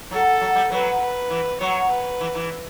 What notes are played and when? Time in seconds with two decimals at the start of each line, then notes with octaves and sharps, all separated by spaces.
0.11 F#3 A4
0.41 F#3
0.56 G3
0.71 F#3 B4
1.01 B4
1.30 E3
1.60 F#3 C#5
1.91 B4
2.21 E3
2.35 E3